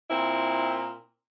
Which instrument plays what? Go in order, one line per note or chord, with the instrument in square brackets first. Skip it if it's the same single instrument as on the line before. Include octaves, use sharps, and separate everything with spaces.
[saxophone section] A#2 C4 E4